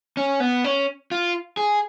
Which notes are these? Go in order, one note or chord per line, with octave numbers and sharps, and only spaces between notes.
C#4
B3
C#4
F4
G#4